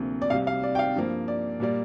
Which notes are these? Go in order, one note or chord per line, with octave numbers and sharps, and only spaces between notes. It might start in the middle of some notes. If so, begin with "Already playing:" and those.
Already playing: D2 C3 F3 A#3
D5
C2 C3 G3 F5
F5
D5
G5
F5
G2 F3 A#3
D5
A#2 G3 A#3 D5